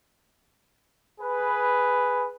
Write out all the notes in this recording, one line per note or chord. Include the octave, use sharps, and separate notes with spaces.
G#4 B4